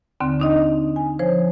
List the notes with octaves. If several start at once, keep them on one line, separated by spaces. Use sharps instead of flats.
D#2 D3 C4
D4 D#4 D#5
G#5
F3 C5 C#5